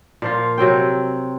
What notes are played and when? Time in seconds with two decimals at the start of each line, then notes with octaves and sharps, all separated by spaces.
0.22 A#2 F3 F4
0.58 C3 F#3 C4 G5